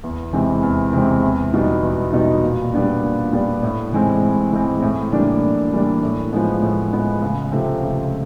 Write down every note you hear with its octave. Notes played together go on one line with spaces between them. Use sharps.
E2
C3 E3 G#3 C4
E2
C3 E3 G#3 C4
E2
B2 G3 B3 D#4
E2
B2 G3 B3 D#4
A#2
G3 B3 D4
A#2
G3 B3 D4
A2
E3 G#3 C4
A2
E3 G#3 C4
A2
E3 G3 A#3 D4
A2
E3 G3 A#3 D4
A2
F3 G#3 B3
A2
F3 G#3 B3
C#2
C3 F3 A3 C4
C#2